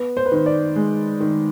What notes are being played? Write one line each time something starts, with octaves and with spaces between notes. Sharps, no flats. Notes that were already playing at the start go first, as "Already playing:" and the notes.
Already playing: B3
C5
B4
D#3 C5
D5
G#3
D#3